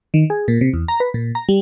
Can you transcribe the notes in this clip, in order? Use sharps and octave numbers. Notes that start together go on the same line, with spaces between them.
D#3
G#4
A#2
C3
E2
A#5
B4
A#2
A#5
G3